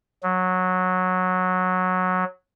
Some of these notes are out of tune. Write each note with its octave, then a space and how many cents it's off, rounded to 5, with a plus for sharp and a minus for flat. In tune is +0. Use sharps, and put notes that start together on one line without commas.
F#3 -10